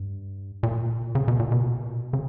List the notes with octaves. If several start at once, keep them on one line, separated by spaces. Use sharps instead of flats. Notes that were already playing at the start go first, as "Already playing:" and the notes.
Already playing: G2
A#2
C#3
B2
A#2
B2
C#3